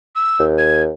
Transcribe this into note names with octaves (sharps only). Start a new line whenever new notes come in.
E6
D#2
G#6